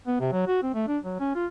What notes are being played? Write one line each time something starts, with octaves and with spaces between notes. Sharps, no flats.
B3
C3
F#3
F#4
C4
A3
D4
F#3
C#4
F4